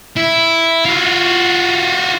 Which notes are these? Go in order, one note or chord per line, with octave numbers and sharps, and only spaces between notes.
E4
F4 F#4